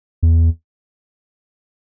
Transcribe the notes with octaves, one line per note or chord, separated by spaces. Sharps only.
E2